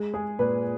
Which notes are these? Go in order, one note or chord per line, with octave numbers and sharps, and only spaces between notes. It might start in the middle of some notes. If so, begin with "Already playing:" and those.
Already playing: G#3
G#3 G#4
A#2 B4